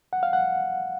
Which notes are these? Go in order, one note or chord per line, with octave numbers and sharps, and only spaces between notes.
F#5
F5
F#5